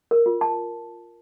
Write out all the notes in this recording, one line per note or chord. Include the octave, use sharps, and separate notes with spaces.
A#4
F4
A5